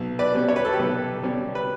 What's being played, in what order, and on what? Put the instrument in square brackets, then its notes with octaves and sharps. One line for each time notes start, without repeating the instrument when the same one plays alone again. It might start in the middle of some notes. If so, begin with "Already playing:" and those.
Already playing: [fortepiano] B1
B4 D5
B2 G3 C#4
C#5
B4
A4
G4 B4
B1
B2 G3 C#4
B4